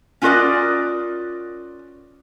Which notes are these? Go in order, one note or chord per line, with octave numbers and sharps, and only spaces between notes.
C#4 F4 F#4 A#4 D5 D#5